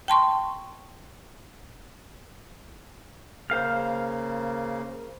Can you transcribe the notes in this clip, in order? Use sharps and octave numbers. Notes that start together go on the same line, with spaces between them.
G5 A5 C6 C#6
C#3 A#3 C5 F5 F6